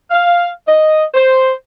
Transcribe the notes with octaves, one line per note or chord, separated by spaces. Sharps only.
F5
D#5
C5